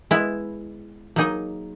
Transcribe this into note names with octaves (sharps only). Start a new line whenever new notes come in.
G#3 B3 E4
F#3 A#3 D#4 G#4 D#5